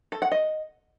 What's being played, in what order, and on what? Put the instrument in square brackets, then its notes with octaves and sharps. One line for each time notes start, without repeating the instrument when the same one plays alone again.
[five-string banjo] A4
F#5
D#5